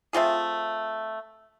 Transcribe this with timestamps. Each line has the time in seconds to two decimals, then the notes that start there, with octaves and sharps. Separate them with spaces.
0.13 A3 C4 F4 G#4